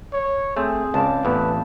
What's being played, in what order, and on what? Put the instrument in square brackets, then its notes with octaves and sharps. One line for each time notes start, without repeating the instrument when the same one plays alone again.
[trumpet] C#5
[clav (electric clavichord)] A3 [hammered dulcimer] C4 [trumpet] G#4
[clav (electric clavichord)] C#2 [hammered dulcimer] D5 F5 A5
[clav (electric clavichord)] A1 E2 [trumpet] B4